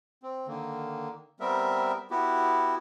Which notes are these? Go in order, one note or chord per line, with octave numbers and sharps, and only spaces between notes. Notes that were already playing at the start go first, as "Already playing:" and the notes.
C4
D3 D#3 A#3
G3 B3 C4 A#4 E5
B3 E4 F#4 G4